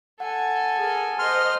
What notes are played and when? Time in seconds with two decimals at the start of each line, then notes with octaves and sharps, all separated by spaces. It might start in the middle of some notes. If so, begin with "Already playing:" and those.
0.20 A4 F#5 G#5
0.77 G#4 A#4
1.19 C5 D#5 C6 F6